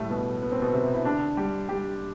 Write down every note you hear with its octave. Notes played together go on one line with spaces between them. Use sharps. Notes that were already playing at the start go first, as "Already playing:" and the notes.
Already playing: A2 G3 A3
B2 B3
B3
C4
B2 B3
C3 C4
E4
D3 D4
G3 G4
G3 G4